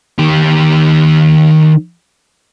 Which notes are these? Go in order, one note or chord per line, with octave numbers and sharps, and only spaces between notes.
D#3 G4